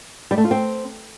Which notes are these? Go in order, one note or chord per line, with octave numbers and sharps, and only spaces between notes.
G3
A3
F4
C4